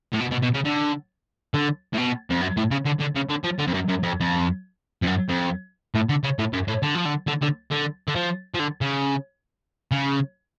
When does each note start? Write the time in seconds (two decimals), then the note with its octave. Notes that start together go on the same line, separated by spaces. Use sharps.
0.13 A2
0.21 B2
0.32 B2
0.43 B2
0.54 C#3
0.65 D3
1.54 D3
1.93 A2
1.97 B2
2.30 F2
2.41 F#2
2.57 A2
2.71 C#3
2.86 D3
3.00 D3
3.16 C#3
3.30 D3
3.44 F3
3.59 D3
3.67 F2
3.74 F#2
3.89 F#2
4.03 F2
4.20 F2
5.02 F2
5.07 F#2
5.29 F2
5.95 A2
6.09 D3
6.23 C#3
6.39 A2
6.53 F#2
6.68 A2
6.83 D3
6.95 F3
7.05 D3
7.27 D3
7.41 D3
7.71 D3
8.08 D3
8.15 F3
8.54 F3
8.59 D3
8.81 C#3
9.91 C#3